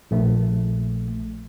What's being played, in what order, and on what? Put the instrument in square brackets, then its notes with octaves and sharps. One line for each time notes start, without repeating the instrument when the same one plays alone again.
[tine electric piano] A#1 A3